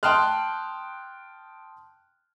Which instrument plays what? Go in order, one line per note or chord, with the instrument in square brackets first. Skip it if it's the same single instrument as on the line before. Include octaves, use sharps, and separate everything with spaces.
[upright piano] G5 A5 C6 D#6 F6 F#6